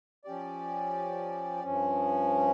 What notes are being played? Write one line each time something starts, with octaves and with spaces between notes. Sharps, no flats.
F3 C#4 G4 D5
G2 F3 C#4